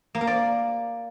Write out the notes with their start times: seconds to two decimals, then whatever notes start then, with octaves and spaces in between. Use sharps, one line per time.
0.15 A#3
0.21 A#4
0.27 D5